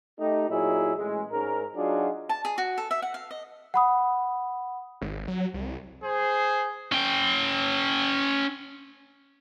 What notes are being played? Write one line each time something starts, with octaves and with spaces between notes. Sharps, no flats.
A3 D#4 G4
A#2 F#3 D#4 E4 G#4
A1 G#3
G#2 C#4 A#4
F#3 D4 D#4 F4 F#4 G#4
A5
G#4
F#4
A4
E5
F#5
F5
D#5
F#5 B5 D#6
G#1
F#3
C2
G#4 C5
C#4 G5